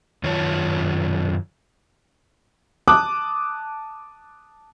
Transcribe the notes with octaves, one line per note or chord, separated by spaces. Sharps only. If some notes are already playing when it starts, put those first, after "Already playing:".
F#2 D#3 F4 C#5 A5
A5 D6 D#6 F#6